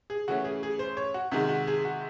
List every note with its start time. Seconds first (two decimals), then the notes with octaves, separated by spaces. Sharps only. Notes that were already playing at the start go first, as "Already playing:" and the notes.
0.10 G#4
0.28 C#3 E3 A3 C#4 F#4
0.44 G#4
0.63 G#4
0.79 C5
0.97 C#5
1.14 F#4
1.31 C3 D#3 G#3 F#4
1.49 F#4
1.67 G#4
1.85 F#4